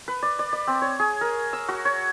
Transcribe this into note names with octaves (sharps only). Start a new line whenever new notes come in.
B4
D5
D5
D5
C4
C#5
G#4
A#4
E6
F#4
C#5